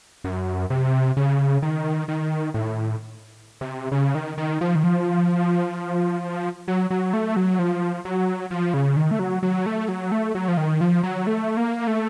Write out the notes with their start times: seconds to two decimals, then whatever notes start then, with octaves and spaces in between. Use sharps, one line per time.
0.24 F#2
0.70 C3
1.17 C#3
1.62 D#3
2.08 D#3
2.54 A2
3.61 C3
3.92 C#3
4.15 D#3
4.38 D#3
4.61 F3
4.75 D#3
4.84 F3
6.68 F#3
6.90 F#3
7.13 A3
7.37 F#3
7.59 F3
8.05 F#3
8.51 F3
8.74 C#3
8.97 D#3
9.11 A3
9.19 F#3
9.43 F#3
9.66 A3
9.88 F#3
10.12 A3
10.35 F#3
10.48 F3
10.57 D#3
10.81 F3
11.03 F#3
11.27 A3
11.57 A#3
11.87 A3